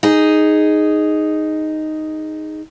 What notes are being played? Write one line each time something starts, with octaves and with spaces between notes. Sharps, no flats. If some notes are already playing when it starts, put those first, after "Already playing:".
D#4 G#4